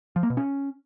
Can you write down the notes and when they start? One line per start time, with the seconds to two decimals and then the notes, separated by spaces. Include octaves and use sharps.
0.16 F3
0.23 A#3
0.30 B2
0.37 C#4